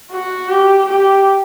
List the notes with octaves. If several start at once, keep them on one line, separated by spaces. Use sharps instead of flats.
F#4
G4
G4